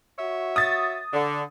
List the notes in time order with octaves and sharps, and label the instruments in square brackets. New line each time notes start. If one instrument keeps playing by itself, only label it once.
[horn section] F#4 C#5 E5
[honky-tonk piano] D#6 A6
[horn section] D3